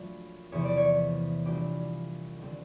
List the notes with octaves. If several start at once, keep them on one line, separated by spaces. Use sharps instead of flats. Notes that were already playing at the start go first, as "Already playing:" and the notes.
Already playing: A#1 A#2 F#3 A3 C#5
E2 C3 F3 C#5
D5
C#5
A#1 A#2 G3 G4
D#2 D3 G3 C4